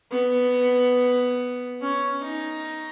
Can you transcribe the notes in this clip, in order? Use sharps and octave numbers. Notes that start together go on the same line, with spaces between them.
B3
C#4
D#4